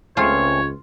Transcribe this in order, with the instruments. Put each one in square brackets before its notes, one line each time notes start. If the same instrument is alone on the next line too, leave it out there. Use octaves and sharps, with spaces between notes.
[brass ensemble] C#2 [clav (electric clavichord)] A3 C4 C#4 [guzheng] F4 [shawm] C#5